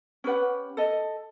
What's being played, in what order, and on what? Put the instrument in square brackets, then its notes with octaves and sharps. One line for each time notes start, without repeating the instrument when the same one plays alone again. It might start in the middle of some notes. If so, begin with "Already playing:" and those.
[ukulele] C#4 G4 B4 F#5
A4 D#5